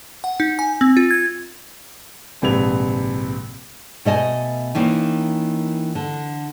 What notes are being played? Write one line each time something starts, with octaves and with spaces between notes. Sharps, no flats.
F#5
D#4
G#5
C4
F4
G#6
A#1 G#2 C3 B4 G#6 F7
B2 A3 D#5 G#5
D#3 E3 A#3 C#4
D3